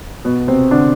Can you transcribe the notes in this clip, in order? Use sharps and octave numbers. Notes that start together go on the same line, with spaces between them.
B2 B3
C3 C4
D3 D4